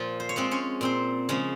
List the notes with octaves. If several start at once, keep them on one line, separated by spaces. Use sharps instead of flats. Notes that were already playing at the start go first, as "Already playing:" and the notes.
Already playing: A#2 F3 F4
C5
C#5
F3 G#3 C4 C5
C#4 C#5
A#2 C4 C5
C#3 F3 G#3 C#4